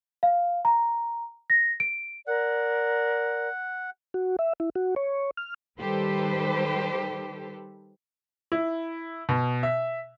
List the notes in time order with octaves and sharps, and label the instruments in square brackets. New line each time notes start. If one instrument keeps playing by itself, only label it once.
[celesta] F5
A#5
A#6
D7
[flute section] A#4 D5 [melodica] F#5
[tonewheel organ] F#4
E5
E4
F#4
C#5
F6
[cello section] D#3 G3 G4 A4 B4 C5
[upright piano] E4
B2
E5